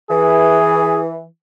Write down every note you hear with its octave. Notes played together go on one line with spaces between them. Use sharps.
E3 G#4